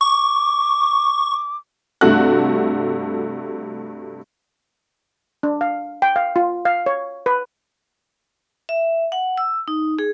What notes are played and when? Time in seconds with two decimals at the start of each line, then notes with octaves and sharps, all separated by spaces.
0.01 C#6 D6
2.01 G2 C3 A3 F#4 F#6
5.43 D4
5.61 F5
6.02 G5
6.16 F5
6.36 F4
6.65 F5
6.86 C#5
7.26 B4
8.69 E5
9.12 F#5
9.38 E6
9.68 D#4
9.99 G#4